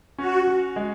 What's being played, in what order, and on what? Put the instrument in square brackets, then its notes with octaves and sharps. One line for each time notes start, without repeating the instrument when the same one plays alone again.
[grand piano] C#4 [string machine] F#4
[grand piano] F#4
G#3